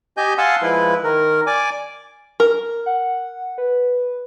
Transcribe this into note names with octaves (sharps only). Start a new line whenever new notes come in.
G4 D#5 G#5 G6
F5 F#5 G#5 A5 C6 E6
F3 G#3 E4 B4
D#3 A#4
D5 G#5 D6
A#4
F#5
B4